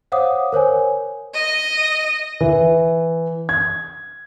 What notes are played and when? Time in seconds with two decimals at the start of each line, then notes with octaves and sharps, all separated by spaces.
0.12 C5 C#5 F5 F#5 D6 D#6
0.52 A#4 C5 C#5 G#5
1.34 D#5
2.41 E3
3.49 G#6